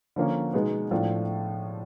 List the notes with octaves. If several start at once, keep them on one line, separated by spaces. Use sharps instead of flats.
D3 F3 A#3 C#4
B2 G#3 B3 D#4
A2 F3 A3 D4 F4